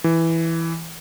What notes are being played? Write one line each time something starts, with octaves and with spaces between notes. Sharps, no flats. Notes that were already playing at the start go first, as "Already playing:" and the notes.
E3